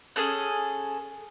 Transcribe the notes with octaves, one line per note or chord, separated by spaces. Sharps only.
C#4 G#4 A4 F#6